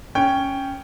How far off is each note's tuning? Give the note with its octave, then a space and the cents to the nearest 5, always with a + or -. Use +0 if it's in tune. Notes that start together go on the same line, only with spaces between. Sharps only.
C#4 +0 G5 +0